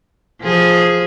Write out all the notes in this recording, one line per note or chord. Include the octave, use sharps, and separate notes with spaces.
F3 G#4